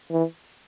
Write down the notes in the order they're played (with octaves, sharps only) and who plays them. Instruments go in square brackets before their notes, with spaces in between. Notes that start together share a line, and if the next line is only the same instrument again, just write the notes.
[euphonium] E3